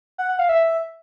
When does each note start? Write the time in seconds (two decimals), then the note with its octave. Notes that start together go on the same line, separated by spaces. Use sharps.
0.18 F#5
0.29 F#5
0.39 F5
0.49 E5